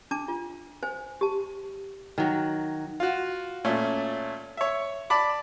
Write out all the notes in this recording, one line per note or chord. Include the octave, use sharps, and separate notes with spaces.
D4 A5 D6
F4
C5 G#5
G4 A5
D#3 F#3
F4 F#4
A#2 A3 C#4
C#5 E5
D5 A5 B5 D6